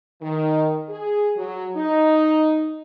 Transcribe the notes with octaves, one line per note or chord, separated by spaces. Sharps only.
D#3
G#4
F#3
D#4